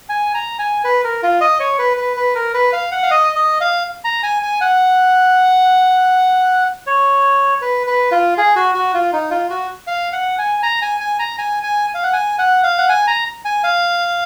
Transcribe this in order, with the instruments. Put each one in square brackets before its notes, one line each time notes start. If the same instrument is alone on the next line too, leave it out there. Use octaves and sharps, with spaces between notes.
[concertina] G#5
A#5
G#5
B4
A#4
F4
D#5
C#5
B4
B4
B4
A#4
B4
F5
F#5
F5
D#5
D#5
F5
A#5
G#5
G#5
F#5
C#5
B4
B4
F4
G#4
F#4
F#4
F4
D#4
F4
F#4
F5
F#5
G#5
A#5
G#5
G#5
A#5
G#5
G#5
F5
F#5
G#5
F#5
F5
F#5
G#5
A#5
G#5
F5